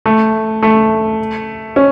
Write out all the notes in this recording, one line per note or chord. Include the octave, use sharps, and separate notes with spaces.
A3
A3
C#4